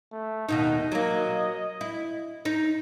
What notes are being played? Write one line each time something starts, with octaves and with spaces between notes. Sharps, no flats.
A3
D#2 B2 D#4 D#5
F#3 A#3
E4
D#4